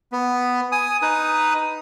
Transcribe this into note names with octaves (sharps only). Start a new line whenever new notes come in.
B3
G#5 D#6
D#4 B4 D#6